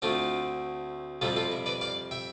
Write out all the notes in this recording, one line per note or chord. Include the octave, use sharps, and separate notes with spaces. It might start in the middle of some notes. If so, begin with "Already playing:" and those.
D2 D3 A3 C4 D4 F4
F2 C3 G3 C4 F4 A4
F4 A4
E4
B4 D5
D5 F5
E5 G5